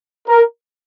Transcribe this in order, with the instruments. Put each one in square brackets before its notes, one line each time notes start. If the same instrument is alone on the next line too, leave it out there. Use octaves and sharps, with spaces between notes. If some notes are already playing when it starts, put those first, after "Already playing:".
[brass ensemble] A#4